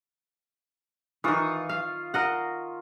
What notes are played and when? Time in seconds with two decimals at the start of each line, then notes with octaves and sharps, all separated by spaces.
1.24 D#3 E3 F4 C#6 D#6
1.69 F5
2.14 A#4 D#5 F#5